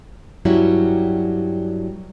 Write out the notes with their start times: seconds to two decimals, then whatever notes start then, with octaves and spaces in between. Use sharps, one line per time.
0.45 G2 F#3 G3 C#4 E4 F#4